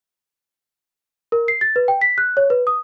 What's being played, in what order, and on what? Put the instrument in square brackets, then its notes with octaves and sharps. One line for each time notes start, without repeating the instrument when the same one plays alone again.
[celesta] A#4
C7
A6
B4
G5
B6
F#6
C#5
B4
D#6